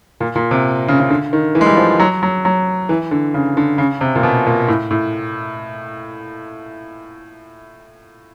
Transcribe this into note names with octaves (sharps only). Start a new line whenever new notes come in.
A#2
A#2
C3
C#3
C#3
D3
D#3
E3
G#3
G3
F3
F#3
F#3
F#3
E3
D3
C#3
D3
C#3
C3
A#2
B2
A#2
A2
A2